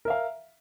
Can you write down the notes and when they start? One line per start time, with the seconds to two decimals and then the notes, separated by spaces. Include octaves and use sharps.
0.05 A#4
0.08 E5
0.10 F5